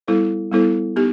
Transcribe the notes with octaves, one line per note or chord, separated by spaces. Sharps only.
G3 B3 E4 A4 C5
G3 B3 E4 A4 C5
B3 D#4 G4